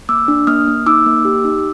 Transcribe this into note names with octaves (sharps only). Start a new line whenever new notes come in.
A#3 D6 E6
D4
A#3 D#6 F6
A#3
D#4 D6 E6
A#3
G4
D#4